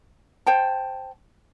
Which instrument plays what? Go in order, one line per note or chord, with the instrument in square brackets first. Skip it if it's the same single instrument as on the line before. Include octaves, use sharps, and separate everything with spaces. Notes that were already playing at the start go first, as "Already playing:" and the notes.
[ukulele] C5 G5 A5